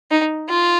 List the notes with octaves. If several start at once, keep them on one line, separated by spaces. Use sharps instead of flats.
D#4
F4